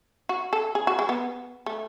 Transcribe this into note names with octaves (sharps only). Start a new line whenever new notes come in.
F#4
A4
G#4
F#4
G#3
B3
A3